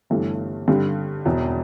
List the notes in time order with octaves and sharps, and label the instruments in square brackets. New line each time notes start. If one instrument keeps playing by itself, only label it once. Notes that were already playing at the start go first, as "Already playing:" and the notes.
[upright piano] G1 G2 E3 A3
G2 D3 G3
E1 E2 B2